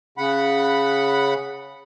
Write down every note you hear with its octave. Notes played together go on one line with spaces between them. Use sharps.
C#3 F#5 B5